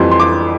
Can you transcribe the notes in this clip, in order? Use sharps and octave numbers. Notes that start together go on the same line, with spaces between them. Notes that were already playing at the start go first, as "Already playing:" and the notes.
Already playing: F2 E3 G3 C6
C6
D6